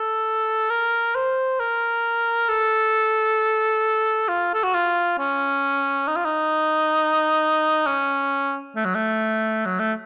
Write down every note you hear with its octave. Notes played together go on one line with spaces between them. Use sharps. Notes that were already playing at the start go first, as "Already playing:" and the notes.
Already playing: A4
A#4
C5
A#4
A4
F4
A4
F#4
F4
C#4
D#4
F4
D#4
C#4
A3
F#3
A3
F#3
A3